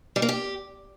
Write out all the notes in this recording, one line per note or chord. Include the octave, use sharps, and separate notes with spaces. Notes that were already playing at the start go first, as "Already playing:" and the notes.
G3
A#3
G4